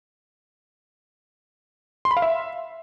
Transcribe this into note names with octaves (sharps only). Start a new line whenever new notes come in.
C6
B5
F5
E5